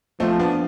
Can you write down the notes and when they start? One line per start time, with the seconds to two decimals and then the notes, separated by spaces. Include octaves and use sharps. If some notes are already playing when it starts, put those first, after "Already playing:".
0.20 F3 A3 C4
0.39 B3 D4